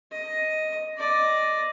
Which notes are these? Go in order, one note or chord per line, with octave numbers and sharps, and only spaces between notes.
D#5
D5 D#5